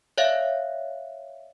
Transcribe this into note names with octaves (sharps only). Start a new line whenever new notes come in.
C#5 D5 E5 F5